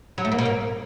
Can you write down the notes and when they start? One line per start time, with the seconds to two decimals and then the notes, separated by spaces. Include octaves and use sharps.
0.18 F#3
0.25 A3
0.32 A#3
0.38 B2
0.45 A#3